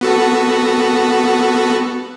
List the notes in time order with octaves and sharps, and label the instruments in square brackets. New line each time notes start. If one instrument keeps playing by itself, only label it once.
[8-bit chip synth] B3 F#4 A4